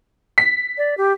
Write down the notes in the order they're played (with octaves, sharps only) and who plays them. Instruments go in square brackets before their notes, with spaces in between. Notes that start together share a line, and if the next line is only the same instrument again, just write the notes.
[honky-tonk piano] B6
[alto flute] D5
G4